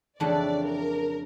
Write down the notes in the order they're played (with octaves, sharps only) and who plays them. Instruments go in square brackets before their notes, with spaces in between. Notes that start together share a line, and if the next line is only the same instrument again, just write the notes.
[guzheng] F2 C#3 E3 A3 D4 [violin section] D5
[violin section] A#4